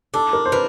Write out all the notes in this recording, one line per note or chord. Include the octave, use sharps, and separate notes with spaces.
D4 A4
A#4
C5
A#3 B4